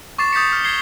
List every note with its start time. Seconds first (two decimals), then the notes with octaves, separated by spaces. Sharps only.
0.18 C#6 D6 A6 C7 E7
0.33 D#6 G6 A6 B6 C#7
0.52 F6
0.64 G#6 C7 G7